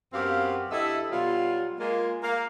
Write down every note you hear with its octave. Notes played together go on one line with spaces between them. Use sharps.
F#2 B3 C4 G4 F5
D2 E4 G4 A4 D#5 E5
B2 F#3 G3 F4
G#3 A#3 F4
A#3 F5